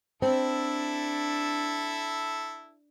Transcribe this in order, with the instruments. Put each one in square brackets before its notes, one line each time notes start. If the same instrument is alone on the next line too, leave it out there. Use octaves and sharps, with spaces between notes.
[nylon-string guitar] C4 [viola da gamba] D4 [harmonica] E4 A4